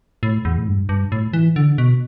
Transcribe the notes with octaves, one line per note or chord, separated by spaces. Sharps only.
A2
E2
A2
G2
G2
A2
E3
D3
B2